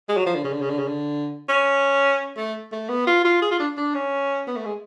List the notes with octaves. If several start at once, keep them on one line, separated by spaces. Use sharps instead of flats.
G#3
F#3
F3
D3
C#3
D3
C#3
D3
C#3
D3
C#4
A3
A3
B3
F4
F4
G#4
F4
D4
D4
C#4
B3
A3
G#3